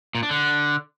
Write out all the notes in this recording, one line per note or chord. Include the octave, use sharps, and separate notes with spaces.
A#2
D4
D3